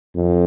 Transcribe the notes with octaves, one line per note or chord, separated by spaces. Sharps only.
F2